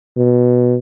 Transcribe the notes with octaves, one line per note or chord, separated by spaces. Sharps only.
B2